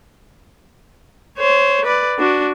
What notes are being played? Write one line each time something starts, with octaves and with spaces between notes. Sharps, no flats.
C5 C#5
B4 D5
D4 F#4